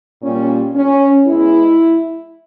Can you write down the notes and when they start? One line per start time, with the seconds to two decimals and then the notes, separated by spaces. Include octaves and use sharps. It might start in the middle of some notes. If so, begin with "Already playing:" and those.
0.22 A#2 G3 C#4
0.74 C#4
1.25 E2 E3 G#3 E4